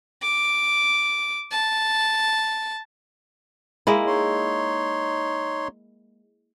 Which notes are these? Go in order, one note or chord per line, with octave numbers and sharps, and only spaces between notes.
D6
A5
G#3 A#3 E4
D#4 C#5 C6